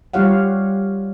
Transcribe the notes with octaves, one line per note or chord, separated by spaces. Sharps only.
G3 F4 G4 C#5 F5 F#5